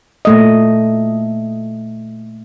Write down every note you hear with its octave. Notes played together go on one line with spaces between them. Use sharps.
A#2 A3 D#5